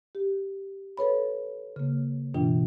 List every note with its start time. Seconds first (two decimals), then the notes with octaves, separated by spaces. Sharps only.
0.15 G4
0.97 A4 B4 C#5 B5
1.76 C#3 A#3
2.34 G2 B2 E3 D4 F4 G5